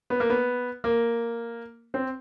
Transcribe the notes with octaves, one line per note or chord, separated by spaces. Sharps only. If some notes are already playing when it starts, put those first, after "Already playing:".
B3
A#3
B3
A#3
C4